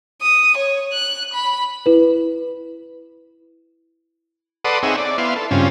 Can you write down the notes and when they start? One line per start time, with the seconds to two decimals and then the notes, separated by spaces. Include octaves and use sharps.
0.21 D#6
0.57 C#5
0.93 F#6
1.33 B5
1.86 E4 B4
4.64 A4 B4 D5 F#5 C6 D#6
4.83 C4 D#4 G#4 C#5 E5 F#5
4.98 D5
5.18 B3 E4 F5 C6
5.36 A4
5.51 G2 C#3 C4 C#4 F4